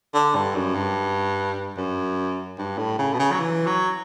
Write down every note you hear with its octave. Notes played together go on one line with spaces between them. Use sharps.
D3
G2
F#2
G2
F#2
G2
A2
C#3
B2
C#3
F#3
E3
F#3